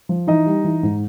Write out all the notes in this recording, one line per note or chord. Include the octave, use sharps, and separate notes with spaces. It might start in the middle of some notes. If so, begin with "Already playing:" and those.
F3
E3 D#4 D#5
G3
E3
G#2